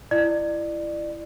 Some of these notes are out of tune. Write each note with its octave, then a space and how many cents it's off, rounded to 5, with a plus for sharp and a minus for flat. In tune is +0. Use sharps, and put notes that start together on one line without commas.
E4 +25 D5 +30